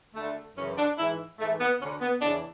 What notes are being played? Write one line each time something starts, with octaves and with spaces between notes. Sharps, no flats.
D2 D3 A3
F#2 C#3 E3 C#4
D4
G#2 E3 E4
G#2 E3 A3
B3
D2 D3 C#4
B3
E2 C#3 E3 D4